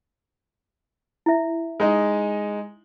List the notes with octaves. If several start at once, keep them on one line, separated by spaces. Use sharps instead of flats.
E4 E5
G#3 D#4